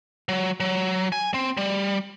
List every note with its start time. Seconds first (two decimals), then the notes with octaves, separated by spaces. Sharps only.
0.29 F#3
0.60 F#3
1.12 G#5
1.34 C4
1.57 G3